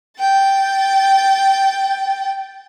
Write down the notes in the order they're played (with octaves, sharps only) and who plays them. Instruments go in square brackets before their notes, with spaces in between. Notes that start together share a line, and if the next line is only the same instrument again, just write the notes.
[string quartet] G5 A6